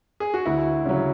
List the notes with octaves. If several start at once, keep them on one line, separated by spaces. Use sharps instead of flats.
G#4
F#4
D2 E4
C#3 F#3